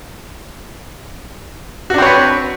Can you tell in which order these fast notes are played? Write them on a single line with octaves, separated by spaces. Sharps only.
F#4 D4 C4 C#5 B4